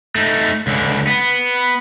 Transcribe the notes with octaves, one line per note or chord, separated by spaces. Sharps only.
A3 D#4
C#2 D3
B3